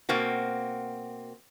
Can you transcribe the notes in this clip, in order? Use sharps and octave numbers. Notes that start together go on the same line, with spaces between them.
B2 A#3 C4 F#4